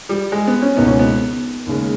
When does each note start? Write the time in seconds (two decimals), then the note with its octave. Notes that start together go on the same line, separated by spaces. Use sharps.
0.09 G3
0.32 G#3
0.47 B3
0.62 C#4
0.76 C#2 B2 A#3 B3 D#4
0.88 C#4
0.99 B3
1.66 D#2 C#3 G#3